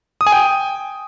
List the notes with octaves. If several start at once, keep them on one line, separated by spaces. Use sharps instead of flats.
D#6
G#5
G5